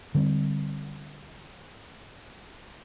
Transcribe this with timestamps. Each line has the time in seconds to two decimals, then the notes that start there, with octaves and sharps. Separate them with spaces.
0.15 D3 G3 C4